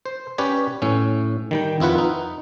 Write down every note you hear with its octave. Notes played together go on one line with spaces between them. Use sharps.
C5
C#4 G4 B4 C#5 D5
A2 C#4
D#3 G3 G5
F2 E4 F4 B4 F#5
D#4